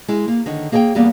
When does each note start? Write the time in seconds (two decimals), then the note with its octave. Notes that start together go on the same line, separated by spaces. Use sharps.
0.08 G#3 E4
0.28 A#3
0.46 D3 D#3 C#5
0.72 A#3 G#4 C#5 F#5 G5
0.95 E2 G3 A#3 B3 G#4 D5